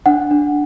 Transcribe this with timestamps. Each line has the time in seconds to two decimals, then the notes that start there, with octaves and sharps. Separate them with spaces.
0.06 D4 F#5
0.31 D4